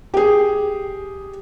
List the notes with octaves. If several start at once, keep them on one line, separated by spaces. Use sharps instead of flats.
G4 G#4